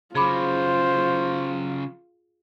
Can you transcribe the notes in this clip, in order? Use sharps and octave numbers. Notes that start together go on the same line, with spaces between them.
C#3 F#3 F4 G#4 C5 B5 D6